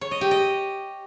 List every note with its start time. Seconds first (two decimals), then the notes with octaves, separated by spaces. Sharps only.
0.01 C#5
0.11 D#5
0.21 G4
0.31 D#5